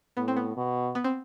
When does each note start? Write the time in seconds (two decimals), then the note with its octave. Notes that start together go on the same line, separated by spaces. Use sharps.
0.17 A2 B3
0.28 C4
0.36 B3
0.57 B2
0.95 B3
1.04 C4